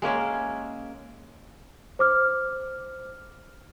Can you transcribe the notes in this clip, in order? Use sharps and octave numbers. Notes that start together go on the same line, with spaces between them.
G#3 A#3 C#4 E5
C5 D6 F6